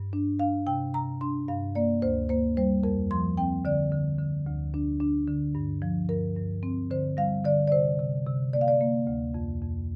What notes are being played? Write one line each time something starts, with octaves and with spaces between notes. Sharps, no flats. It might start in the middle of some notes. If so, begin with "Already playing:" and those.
Already playing: G2
D4
D4 F5
C3 G5
C3 A#5
D4 C6
G2 F5
A#3 D5
D2 C5
A#3 C5
G3 C5
F2 A#4
F3 C6
C4 G5
D3 D5
D3
D3
D2
D4
D4
D3
G2
F3
G2 A#4
G2
C4
D3 C5
G3 F5
D3 D5
D5
C3 C5
C3
C3
A#3 D5
F5
D5
A#3
D2
F2
F2